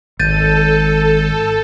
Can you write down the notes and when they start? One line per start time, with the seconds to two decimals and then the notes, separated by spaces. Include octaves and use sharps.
0.20 G#1 A4 G6 A6 D#7